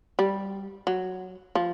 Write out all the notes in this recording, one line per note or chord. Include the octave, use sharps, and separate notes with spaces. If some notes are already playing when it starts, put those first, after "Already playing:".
G3
F#3
F3